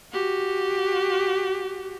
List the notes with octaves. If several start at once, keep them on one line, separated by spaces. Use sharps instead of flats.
F#4 G4